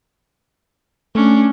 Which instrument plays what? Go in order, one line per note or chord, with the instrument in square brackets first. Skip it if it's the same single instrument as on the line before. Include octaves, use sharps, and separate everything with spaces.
[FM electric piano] A3 [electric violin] C#4 D4